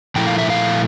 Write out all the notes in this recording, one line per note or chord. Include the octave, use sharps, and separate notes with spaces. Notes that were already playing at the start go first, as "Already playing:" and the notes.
A#2 F3 A3 E4 G5
F5
E5
F5